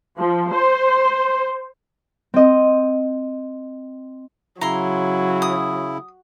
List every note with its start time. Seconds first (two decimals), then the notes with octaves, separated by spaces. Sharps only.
0.18 F3
0.51 C5
2.34 C4 D#5
4.61 C#3 F#3 E4 A#5 C6
5.42 D#6